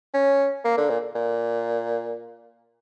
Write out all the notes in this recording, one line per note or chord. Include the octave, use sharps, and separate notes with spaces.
C#4
A#3
D3
A#2
A#2